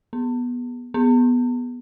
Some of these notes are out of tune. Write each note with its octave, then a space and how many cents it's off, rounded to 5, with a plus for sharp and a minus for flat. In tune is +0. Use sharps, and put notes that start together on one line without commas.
B3 -15
B3 -5